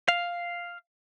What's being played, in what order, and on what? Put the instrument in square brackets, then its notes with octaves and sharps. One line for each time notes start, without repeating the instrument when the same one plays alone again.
[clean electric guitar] F5